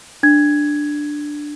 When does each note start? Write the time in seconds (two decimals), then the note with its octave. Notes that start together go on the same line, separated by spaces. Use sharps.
0.23 D4 G#6